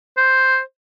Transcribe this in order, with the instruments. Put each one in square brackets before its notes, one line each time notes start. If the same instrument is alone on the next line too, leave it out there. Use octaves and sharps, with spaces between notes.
[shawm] C5